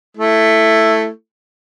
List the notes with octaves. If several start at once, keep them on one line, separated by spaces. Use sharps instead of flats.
A3 E4